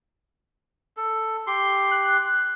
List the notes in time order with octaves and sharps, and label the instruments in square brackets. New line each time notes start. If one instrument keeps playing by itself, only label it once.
[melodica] A4
G4 C6
[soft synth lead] F#6